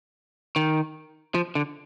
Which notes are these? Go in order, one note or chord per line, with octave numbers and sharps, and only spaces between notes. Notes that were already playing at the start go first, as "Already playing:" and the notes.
D#3
F3
D3